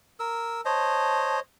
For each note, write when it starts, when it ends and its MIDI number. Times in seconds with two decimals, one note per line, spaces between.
0.20 0.61 70
0.20 0.61 88
0.65 1.40 72
0.65 1.40 73
0.65 1.40 75
0.65 1.36 81